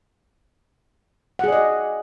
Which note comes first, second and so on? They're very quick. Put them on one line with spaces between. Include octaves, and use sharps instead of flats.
F#5 G#4 D5 D#5